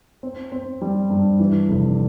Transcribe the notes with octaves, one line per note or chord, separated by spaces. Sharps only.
C4
C4
G3
G2
E3
F1